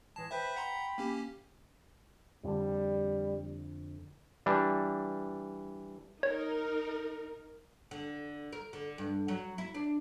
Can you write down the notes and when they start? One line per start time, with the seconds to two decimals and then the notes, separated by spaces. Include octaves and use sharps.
0.16 A2 E3 G#3 A5
0.31 B4 C5 E5 G5 B5
0.56 F#5 A#5 C6
0.98 A#3 C#4 G4
2.44 F2 D3 G3
4.46 E3 G3 D4
6.23 D#4 A#4 C#5
7.91 D3
8.53 A#4
8.73 D3
8.98 G2
9.28 F#3
9.58 E4
9.75 D4